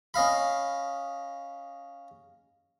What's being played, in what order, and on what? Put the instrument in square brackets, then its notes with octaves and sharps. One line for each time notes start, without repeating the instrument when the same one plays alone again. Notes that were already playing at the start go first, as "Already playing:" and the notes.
[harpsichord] C#4 D#5 F5 B5